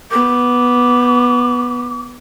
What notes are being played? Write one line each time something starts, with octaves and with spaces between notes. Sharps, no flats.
B3 D6